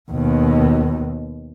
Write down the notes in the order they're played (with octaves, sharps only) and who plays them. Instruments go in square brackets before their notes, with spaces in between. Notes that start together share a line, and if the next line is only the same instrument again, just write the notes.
[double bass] D#2 B2